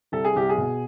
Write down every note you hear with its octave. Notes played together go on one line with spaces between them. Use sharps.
C2 A4
G#4
C2 G4
G#4
B2